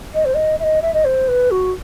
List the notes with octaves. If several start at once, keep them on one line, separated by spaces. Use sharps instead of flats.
D#5
C5
D#5
E5
D#5
E5
D#5
C5
B4
F#4